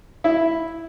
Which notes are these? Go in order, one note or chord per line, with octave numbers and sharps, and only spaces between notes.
E4